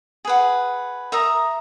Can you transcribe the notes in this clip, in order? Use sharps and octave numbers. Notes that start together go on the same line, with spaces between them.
G#4 B4 F#5
A#4 E5 A#5 D#6